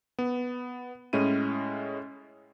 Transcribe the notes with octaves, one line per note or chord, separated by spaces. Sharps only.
B3
A2 G#3 C#4 E4 D#7